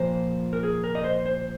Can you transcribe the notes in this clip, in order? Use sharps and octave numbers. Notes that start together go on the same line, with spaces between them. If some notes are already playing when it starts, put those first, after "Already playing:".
Already playing: A#2 F3 A#3 C5
A#4
G#4
A#4
D#5
C5
C5